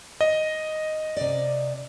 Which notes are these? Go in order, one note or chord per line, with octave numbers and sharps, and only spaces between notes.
D#5
C3 D5